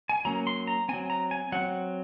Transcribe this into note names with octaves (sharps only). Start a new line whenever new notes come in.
G#5
F#3 A#3 C#4 A#5
C6
A#5
F#3 C4 G#5
A#5
G#5
F#3 C4 F#5